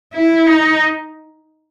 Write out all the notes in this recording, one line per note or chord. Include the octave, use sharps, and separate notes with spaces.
E4
D#4